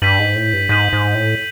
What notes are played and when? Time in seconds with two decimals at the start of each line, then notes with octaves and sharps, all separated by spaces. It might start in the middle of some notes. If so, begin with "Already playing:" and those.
0.02 G2 G6 B6 D#7 F#7
0.19 G#2
0.36 A2
0.53 G2
0.69 G#2 G6 B6 D#7 F#7
0.93 G#2
1.15 A2